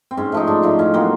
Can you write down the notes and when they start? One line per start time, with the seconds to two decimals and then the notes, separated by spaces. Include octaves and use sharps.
0.11 C4
0.17 G#2 C#4
0.32 F3 A3 D#4
0.47 G#2 D4
0.62 F3 A3 D#4
0.79 A2 C#4
0.94 F#3 A#3 C4